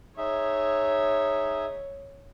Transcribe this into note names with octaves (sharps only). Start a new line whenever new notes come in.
D#4 G#4 C#5 E5